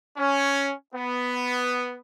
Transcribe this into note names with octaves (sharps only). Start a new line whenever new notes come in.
C#4
B3